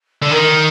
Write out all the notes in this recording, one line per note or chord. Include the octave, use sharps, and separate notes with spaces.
D3
D#3 A#4